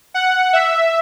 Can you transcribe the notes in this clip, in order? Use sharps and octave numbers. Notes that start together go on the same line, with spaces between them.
F#5
E5